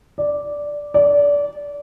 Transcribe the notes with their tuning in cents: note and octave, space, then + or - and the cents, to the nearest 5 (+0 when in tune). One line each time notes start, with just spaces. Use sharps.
D5 -5
D5 -25